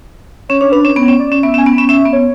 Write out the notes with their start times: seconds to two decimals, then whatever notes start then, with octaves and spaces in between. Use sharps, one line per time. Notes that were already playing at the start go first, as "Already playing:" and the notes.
0.49 C#4 C#5
0.61 D4 C#5
0.72 D4 B4
0.85 C#4 C#5
0.96 B3 C#5
1.08 C#4
1.20 D5
1.32 C#4
1.43 B3 E5
1.54 C#4
1.58 G#5
1.66 B3
1.73 B5
1.78 C#4
1.89 C#4 E5
2.06 B3
2.13 C#5